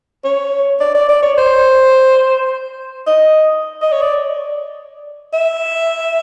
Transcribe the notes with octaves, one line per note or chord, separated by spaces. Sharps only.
C#5
D5
D5
D5
C#5
C5
D#5
D#5
C#5
D5
E5